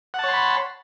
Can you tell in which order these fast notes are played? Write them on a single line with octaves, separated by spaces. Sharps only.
F#5 A5 C#5 C6 B5